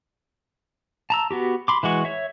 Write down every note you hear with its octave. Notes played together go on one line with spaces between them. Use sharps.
A5 A#5 E6
B3 F#4 G4
B5 C6 D6
E3 G#3 F#4 C#6
C#5 E5